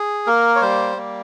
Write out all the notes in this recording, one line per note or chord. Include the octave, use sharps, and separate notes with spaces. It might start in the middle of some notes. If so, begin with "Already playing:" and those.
Already playing: G#4
A#3 A#4
C#5
G3 C5
A#3